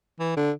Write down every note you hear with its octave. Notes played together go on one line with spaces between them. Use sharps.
E3
D3